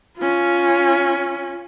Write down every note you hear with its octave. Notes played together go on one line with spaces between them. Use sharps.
C#4 F4